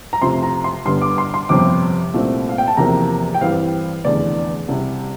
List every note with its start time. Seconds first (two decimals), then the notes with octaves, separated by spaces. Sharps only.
0.13 A#5
0.22 F2 C3 F3 A3 C6
0.43 A#5
0.64 C6
0.85 G1 G2 D3 C6
1.01 D6
1.18 C6
1.34 C6
1.49 G1 F2 C3 G3 C4 D6
2.14 C2 A#2 A3 C4
2.49 F5
2.58 G5
2.68 A5
2.77 E2 C3 F3 A#3 A#5
3.34 G5
3.41 G2 E3 G3 C4 F5
4.04 F1 E2 D3 D5
4.68 C2 C3 G3